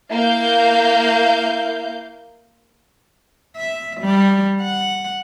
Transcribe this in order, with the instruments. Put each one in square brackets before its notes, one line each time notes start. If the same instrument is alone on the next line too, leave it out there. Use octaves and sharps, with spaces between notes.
[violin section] A#3 F5 G6 [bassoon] E4
[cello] E5
G3
F#5